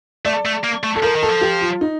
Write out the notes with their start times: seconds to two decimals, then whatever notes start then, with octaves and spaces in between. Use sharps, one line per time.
0.25 A3 D5
0.45 A3
0.64 A#3
0.83 A3
0.96 A4
1.03 F3 A#4
1.16 D#3
1.23 A4
1.29 F3
1.41 G4
1.61 F4
1.81 D#4